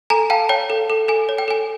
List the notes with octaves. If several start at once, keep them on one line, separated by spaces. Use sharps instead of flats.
A4 G#5 A#5
F5 G5 A5
C#5 G5
A4
A4
A4 G#5
C#5
G5
A4 G#5